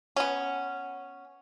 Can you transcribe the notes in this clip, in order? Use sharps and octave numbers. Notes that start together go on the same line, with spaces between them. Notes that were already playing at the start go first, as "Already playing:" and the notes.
B3 C#4